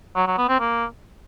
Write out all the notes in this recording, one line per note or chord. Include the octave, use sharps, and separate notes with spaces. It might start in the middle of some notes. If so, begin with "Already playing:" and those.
F#3
F#3
B3
C4
A#3